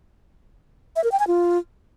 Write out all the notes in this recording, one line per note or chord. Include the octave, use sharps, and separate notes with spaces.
E5
A#4
G5
G#5
F4